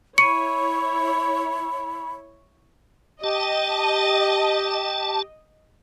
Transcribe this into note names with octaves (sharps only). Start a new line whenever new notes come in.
E4 C#5 B5 C#6 C#7 D#7
G4 D#5 A5